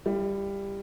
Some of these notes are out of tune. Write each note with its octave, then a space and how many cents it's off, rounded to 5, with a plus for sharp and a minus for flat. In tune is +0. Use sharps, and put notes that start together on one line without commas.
G3 +15 E4 +45